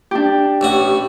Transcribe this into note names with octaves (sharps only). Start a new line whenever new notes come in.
D4 G4
A1 A2 F#4